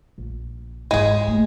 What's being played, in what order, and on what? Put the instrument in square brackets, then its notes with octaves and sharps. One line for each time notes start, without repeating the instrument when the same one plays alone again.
[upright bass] A#1
[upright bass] G#2 E4 [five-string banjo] G#3 G#4
[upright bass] A3 A#3